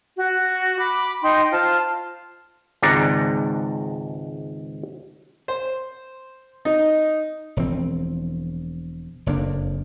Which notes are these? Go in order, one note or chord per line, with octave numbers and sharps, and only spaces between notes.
F#4
B5 D6
D#4 D#5 G5 C6
F4 C5 A5
G#1 C#2 G#2 D5 F#5 A#5
C5
D#4
E1 E3 F3 C4
F#1 F2 A#3 D4